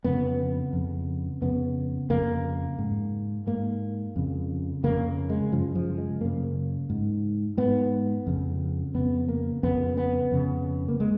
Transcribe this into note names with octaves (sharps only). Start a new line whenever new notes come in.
F2 C#3 B3
F2 C#3
F2 C#3 B3
F2 C#3 A#3
G#2
G#2 A#3
F2 C#3
F2 C#3 A#3
G#3
F#2 C#3 F3
F3
G#3
F#2 C#3 A#3
G#2
G#2 B3
F2 C#3
F2 C#3 B3
A#3
F2 C#3 B3
B3
F2 C#3
A#3
C#3 G#3